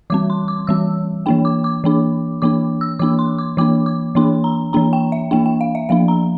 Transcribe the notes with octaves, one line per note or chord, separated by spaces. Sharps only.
E3 G3 C4 D6
C6
D6
E3 G3 C4 E6
E3 A#3 D4 G5
D6
D6
E3 A#3 D4
E3 A#3 D4 D6
E6
E3 A#3 D4 D6
C6
D6
E3 A#3 D4 D6
D6
E3 A#3 D4 C6
A#5
E3 A#3 D4 A#5
G5
E5
E3 A#3 D4 G5
G5
F5
E5
F3 A#3 D4 F5
A#5